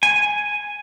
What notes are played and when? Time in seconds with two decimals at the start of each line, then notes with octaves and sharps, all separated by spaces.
0.03 G#5